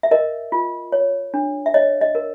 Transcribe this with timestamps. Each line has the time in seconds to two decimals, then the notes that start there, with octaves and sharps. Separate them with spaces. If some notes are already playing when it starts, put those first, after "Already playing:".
0.03 E5
0.11 A#4 D#5
0.52 F4
0.92 C#5
1.34 D4
1.66 E5
1.74 C#5 D#5
2.01 D#5
2.15 A#4